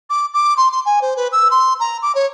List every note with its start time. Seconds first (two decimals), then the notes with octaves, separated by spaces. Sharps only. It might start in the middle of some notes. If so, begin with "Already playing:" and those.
0.10 D6
0.34 D6
0.57 C6
0.71 C6
0.85 G#5
1.01 C5
1.16 B4
1.32 E6
1.51 C6
1.80 A#5
2.02 D6
2.15 C#5